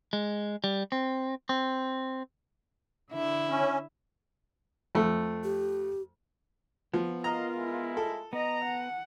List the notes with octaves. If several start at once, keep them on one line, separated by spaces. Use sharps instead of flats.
G#3
G3
C4
C4
D3 E4 E5
C#4
F2 A3
G4
F3 B3
F4 A#4 D#5 F5 A#5
G#3 E4
A4
B3 D#5 A#5
F#5